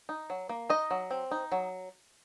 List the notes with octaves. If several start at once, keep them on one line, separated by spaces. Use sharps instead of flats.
D#4
F#3
A#3
D#4 D#5
F#3
C4
D#4
F#3